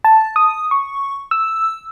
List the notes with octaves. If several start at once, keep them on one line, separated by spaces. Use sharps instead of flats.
A5
D#6
C#6
E6